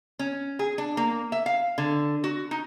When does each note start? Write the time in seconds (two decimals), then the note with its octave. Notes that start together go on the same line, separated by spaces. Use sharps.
0.19 C#4
0.59 G#4
0.78 D4
0.97 A#3
1.32 E5
1.46 F5
1.78 D3
2.24 F#4
2.51 D#4